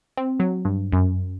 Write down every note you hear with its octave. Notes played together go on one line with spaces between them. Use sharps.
C4
F#3
G2
F#2